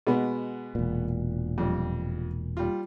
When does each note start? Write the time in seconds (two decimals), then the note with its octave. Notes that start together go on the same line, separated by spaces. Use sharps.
0.07 B2 G#3 B3
0.75 E1 A#2
1.58 F2 G3
2.57 G3 F4